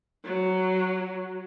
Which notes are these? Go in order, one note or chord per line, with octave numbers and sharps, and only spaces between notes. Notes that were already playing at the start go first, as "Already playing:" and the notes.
F#3